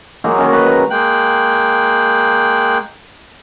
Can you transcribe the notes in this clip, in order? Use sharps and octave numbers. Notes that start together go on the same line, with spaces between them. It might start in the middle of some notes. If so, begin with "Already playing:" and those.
F#3 G#3 A#3 D#4
D#3 C#4
B4 A#5
A#5
G#3 A#3 G5 F#6